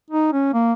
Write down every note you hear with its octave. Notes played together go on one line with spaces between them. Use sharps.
D#4
C#4
A#3